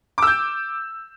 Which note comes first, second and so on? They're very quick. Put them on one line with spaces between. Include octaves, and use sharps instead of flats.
D6 E6 G6